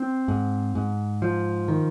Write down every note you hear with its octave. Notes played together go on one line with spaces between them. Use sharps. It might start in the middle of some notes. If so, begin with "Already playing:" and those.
Already playing: C4
G#2
G#2
F3
D#3